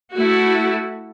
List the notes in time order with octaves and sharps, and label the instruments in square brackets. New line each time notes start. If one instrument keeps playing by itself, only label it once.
[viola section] A3 E4 F#4